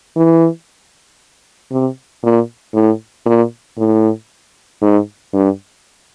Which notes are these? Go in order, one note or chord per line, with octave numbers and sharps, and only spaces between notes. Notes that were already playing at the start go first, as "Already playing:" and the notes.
E3
C3
A#2
A2
A#2
A2
G#2
G2